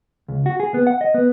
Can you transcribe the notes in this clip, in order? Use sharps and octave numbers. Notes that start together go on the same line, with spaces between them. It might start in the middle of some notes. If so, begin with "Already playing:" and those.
C#2
F#4
G#4
B3
F#5
D#5
B3